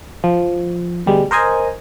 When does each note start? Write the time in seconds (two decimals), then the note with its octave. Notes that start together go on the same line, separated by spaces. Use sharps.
0.24 F3
1.06 D2 B2 G3 G#3
1.31 A#4 C5 D#5 G#5 A#5